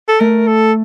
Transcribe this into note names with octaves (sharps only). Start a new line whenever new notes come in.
A4
A3 A#4
A4